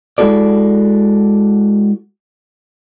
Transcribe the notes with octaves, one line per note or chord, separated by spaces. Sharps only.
G#3 E4 F#4 A4 D5